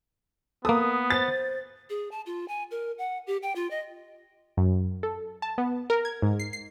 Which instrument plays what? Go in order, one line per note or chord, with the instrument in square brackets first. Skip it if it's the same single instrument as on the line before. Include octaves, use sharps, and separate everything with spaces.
[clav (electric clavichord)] A#3 A4 [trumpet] B3 [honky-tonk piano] D#6
[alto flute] C5 [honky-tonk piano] A6
[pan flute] G#4
A5
F4
G#5
A#4
F#5
G4
G5
F4
D#5
[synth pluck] F#2
A4
A5
B3
A#4
G#6
G#2
C7
C7